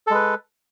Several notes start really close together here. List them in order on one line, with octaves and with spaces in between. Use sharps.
A4 G#3 B4